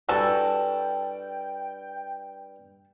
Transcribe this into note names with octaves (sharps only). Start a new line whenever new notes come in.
G2 E4 F#4 A4 G5